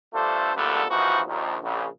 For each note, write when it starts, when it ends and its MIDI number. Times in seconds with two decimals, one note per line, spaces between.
0.13 0.54 43
0.13 0.54 57
0.13 0.54 62
0.13 0.54 65
0.13 0.54 69
0.13 0.54 72
0.56 0.83 32
0.56 0.83 38
0.56 0.83 46
0.56 0.83 55
0.56 0.83 59
0.56 0.83 69
0.90 1.21 32
0.90 1.21 39
0.90 1.21 52
0.90 1.21 53
0.90 1.21 63
0.90 1.21 66
1.27 1.57 34
1.27 1.57 39
1.63 1.86 34
1.63 1.86 49